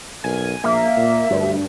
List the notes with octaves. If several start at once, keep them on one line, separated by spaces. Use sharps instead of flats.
B1 A#4 G#5
A#1 A#3 E5
A#2
D2 G2